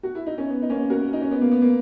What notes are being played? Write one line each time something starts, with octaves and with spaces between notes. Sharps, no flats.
F#4
E4
D#4
C#4
B3
D#4
A#3 C#4
F#4 A#4
D#4
C#4
B3
A#3
B3
A#3